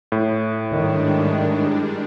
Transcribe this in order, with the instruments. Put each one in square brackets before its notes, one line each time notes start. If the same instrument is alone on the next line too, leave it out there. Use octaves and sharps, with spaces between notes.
[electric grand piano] A2
[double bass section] G#2 D#3 [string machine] G3 G#3 D4